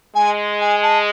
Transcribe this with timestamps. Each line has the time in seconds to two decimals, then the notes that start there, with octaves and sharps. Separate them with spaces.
0.15 G#3 G#5
0.61 G#5
0.83 A5